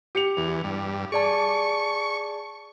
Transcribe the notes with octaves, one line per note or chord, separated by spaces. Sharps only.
G4 C#7 F7
E2
G2
G#4 D5 A5 C#6